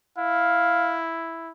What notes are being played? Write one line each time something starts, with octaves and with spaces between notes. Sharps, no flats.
E4 F5